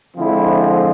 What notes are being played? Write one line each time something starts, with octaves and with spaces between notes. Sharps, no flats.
D3 F3 G#3 C4 E4